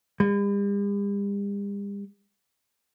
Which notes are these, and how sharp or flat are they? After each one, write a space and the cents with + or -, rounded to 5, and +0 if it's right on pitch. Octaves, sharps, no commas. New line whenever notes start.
G3 +45